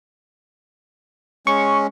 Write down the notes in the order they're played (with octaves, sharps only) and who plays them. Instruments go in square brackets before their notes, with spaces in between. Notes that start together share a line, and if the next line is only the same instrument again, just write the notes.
[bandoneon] G#3 C#4 [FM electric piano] C#6